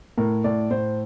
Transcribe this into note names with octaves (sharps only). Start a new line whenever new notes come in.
A2 A#4
A2 D5
A2 C5